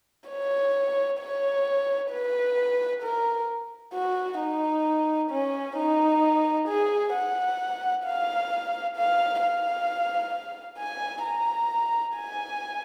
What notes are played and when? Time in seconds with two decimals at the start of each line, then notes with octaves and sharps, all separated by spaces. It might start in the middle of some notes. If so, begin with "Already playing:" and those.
0.29 C#5
1.20 C#5
2.12 B4
3.03 A#4
3.94 F#4
4.40 D#4
5.30 C#4
5.77 D#4
6.68 G#4
7.13 F#5
8.05 F5
8.96 F5
9.41 F5
10.79 G#5
11.24 A#5
12.16 G#5